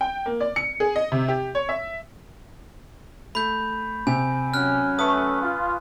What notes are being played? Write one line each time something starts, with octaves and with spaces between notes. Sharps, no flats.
G5
A#3
D5
C#7
G#4
D#5
C3
G4
C#5
E5
A3 B5 G6
C3 G#5
F#3 C#4 F6 F#6
A3 B4 C#6 D#6
F4